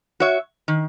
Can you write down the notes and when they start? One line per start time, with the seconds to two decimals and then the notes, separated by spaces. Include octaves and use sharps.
0.20 F#4 C#5 E5
0.68 D#3